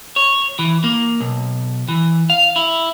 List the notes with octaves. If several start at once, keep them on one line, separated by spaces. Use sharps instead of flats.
C#5
E3
A#3
B1
E3
F5
E4